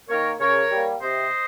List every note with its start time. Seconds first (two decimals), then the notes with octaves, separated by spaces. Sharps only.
0.09 D#3 A#3 A#4 C#5
0.39 C#3 A#4 C#5
0.71 G3 A#3
1.02 C3 C5 D#5